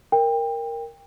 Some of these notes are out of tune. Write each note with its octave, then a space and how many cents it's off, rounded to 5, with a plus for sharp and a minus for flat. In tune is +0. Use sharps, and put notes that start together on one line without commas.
A#4 +0 G5 +25